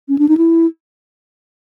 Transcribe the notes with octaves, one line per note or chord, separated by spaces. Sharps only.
C#4
D4
D#4
E4